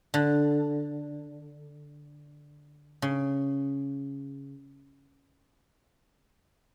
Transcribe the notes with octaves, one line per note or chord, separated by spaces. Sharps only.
D3
C#3